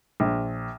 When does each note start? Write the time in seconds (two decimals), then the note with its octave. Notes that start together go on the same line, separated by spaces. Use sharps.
0.20 A#1